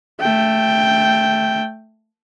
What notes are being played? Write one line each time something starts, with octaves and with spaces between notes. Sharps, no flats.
A3 G5